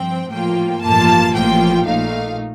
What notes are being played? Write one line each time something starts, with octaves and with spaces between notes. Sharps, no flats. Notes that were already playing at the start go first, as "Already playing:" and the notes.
Already playing: G2 F3 C4 G5
A2 F3 A#3 F4 G5
A1 G2 F3 A#3 F4 A5
A1 A2 F3 A#3 F4 G5
A#1 A#2 A3 D#4 F5